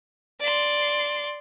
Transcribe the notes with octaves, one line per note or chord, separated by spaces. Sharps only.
D5 C6